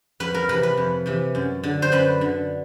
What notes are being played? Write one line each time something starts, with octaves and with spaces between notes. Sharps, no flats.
F2 B4
A#4
C3 E3 B4
B4
F2
C3 E3
F#2
D3
C5
F#2 B4
D3